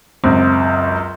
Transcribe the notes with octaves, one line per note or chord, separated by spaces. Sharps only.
C#2 F#2 C4